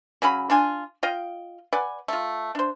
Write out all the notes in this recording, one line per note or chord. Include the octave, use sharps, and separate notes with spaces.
C#3 F#3 C#4 B5
D4 F4 G#5
F4 D#5 F5 G5
B4 D5 F#5 G#5
A3 F4
D4 C5